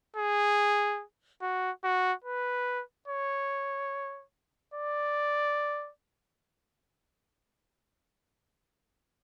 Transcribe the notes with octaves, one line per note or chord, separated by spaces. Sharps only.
G#4
F#4
F#4
B4
C#5
D5